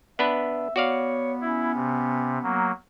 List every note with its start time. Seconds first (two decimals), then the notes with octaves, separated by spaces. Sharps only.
0.19 B3 D4 B4 E5
0.76 B3 F#4 C#5 D5 F5
1.41 C#4 E4
1.75 C3
2.43 F#3 A#3